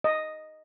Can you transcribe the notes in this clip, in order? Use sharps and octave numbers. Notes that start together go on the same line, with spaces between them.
D#5